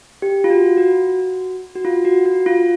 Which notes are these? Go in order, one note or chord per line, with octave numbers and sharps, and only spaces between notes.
G4
F4
F#4
F#4
F#4
F4
F#4
F#4
F4